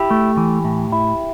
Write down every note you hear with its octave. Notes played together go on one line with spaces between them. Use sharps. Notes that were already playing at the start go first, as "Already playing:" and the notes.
Already playing: E4 G4
A3
E3
A2
E4